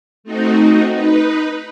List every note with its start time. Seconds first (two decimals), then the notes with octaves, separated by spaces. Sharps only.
0.24 A3 C4 D#4 F#4
0.92 D#4 B4